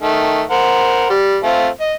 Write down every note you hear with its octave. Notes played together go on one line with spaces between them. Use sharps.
D#3 A3
A#4 C5 F#5
G3
A3 C4 F4
D#5